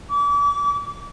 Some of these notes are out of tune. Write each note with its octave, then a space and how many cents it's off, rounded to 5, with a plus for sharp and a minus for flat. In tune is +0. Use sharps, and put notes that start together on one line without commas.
D6 -35